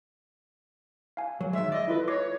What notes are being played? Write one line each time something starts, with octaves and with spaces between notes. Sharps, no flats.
F5 G#5
F#3
D#3 G#3 E5
D5 D#5
E4 F4 A4 B4
C#5 D6 A#6 C7